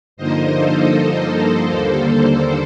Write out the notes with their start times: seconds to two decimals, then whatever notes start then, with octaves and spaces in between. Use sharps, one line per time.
0.17 G2 D3 F3 A#3 D#4 C5 D#5
0.55 A4 C5
1.70 D#2 D3 G3 A#3